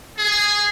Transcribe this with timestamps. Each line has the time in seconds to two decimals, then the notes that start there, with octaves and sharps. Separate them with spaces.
0.18 G#4